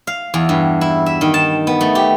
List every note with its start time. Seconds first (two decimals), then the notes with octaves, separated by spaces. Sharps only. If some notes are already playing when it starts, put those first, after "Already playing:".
0.07 F5
0.34 E2
0.49 G2
0.81 E4
1.06 E5
1.21 D#3
1.34 A5
1.67 B3
1.81 A3
1.95 G4